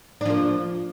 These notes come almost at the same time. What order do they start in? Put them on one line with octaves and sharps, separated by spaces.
D4 F3 A#3